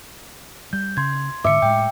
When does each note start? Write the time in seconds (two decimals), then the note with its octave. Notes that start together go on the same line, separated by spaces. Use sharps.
0.73 G3 G6
0.97 C#3 C6 G#6
1.44 G#2 D3 E5 D6 C#7
1.62 A2 G#3 G5